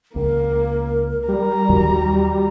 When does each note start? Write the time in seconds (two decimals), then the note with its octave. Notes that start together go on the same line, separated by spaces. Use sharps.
0.16 C#2 A#3 A#4
1.28 G3 A#5
1.69 D#2 D#3 F#3 F#4